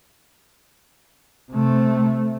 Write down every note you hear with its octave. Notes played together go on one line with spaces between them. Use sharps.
C3 A3